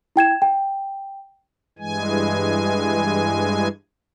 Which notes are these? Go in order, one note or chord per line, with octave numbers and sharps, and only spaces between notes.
E4 G5 G#6 E7
G5
G2 E3 G#3 G#5